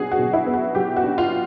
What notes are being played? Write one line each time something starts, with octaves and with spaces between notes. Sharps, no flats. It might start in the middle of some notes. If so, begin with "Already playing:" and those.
Already playing: B2 F#3 B3 D4 F#4 G#4
F#4
B2
E4
B3
F#4
F#3 G4
F#4
D4
F4